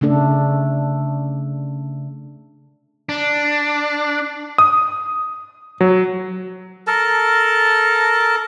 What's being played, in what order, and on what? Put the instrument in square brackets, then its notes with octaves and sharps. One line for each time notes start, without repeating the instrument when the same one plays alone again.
[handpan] C#3 A3 D4 A4
[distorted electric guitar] D4
[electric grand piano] D#6
F#3
[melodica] A4 A#4 A5